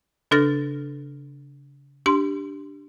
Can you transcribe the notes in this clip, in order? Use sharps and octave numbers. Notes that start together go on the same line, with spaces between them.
C#3 D4 A4 F6 A6 A#6
D4 G4 C6